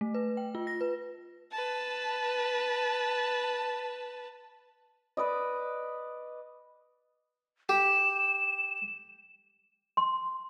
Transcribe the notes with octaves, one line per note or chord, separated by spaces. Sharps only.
A3
B4
G5
F4
A#6
B4
B4 A5
B4 D5 D#5
G4 E7
C6